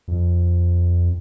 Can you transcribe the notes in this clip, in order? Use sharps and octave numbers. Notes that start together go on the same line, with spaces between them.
F2